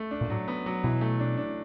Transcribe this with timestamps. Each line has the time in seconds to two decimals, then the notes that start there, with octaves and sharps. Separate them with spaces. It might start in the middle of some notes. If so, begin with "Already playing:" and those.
Already playing: A3
0.11 D4
0.21 A#2
0.30 A2 F#3
0.48 B3
0.66 F#3
0.84 B2 E3
1.01 A3
1.20 D4
1.37 D4